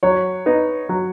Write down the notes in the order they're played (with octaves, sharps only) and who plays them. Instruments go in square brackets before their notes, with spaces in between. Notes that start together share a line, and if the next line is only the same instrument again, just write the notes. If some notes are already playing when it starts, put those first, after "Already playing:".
[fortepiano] F#3 [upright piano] C#5
[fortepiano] B3 D#4
F#3